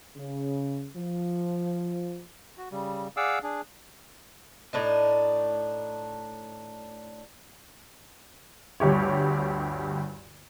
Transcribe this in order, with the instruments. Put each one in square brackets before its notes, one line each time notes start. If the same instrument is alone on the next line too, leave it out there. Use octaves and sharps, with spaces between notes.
[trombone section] C#3
F3
[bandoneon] F#4
C#3 G3
G#4 D5 F5 F#5 D6 E6
D4 G#4
[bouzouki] A2 D4 D#4
[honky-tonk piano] G1 D2 G2 G4 C#5